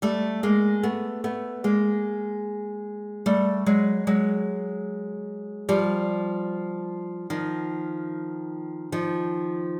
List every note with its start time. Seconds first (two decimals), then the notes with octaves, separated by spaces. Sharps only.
0.02 G3 A3
0.43 G#3 A#3
0.83 A3 B3
1.24 A3 B3
1.64 G#3 A#3
3.26 G3 A3
3.66 F#3 G#3
4.07 F#3 G#3
5.69 F3 G3
7.30 D#3 F3
8.92 D#3 F3